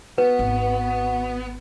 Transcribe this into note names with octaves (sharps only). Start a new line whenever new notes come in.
B3 F#4 B4
G#1